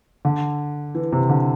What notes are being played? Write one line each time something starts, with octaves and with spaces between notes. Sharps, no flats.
D3
E3
C3
D3